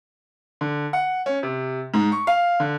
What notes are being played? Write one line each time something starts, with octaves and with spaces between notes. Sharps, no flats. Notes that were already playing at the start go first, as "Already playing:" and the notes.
D3
F#5
C#4
C3
G#2
C#6
F5
D3